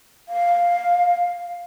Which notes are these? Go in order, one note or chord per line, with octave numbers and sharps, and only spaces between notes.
F5